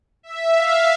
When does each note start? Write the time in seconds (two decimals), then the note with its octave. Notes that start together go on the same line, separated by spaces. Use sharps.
0.23 E5
0.54 F5